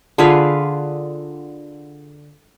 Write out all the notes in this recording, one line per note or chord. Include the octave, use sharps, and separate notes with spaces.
D3 F4 G#4 B4